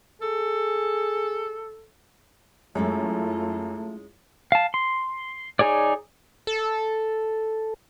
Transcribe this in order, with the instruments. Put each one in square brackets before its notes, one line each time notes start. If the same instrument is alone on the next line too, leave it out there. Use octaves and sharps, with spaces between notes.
[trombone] G#4 [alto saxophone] A4
[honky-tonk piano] F#2 [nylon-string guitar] G#3 C#4 A4 [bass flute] A3 [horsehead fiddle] E4 F4
[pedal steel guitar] F5 A5
C6
D#4 G#4 C#5 D5
[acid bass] A4